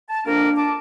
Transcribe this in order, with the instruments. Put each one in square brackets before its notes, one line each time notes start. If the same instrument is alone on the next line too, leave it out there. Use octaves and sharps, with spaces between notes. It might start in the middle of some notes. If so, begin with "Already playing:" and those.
[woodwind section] A5
[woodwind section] F2 A#3 A#4 [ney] D4
[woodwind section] A5 D6